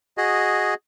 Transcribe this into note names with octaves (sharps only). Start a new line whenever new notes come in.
F#4 G#4 D#5